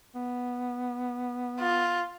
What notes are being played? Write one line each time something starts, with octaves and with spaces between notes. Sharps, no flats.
B3
F4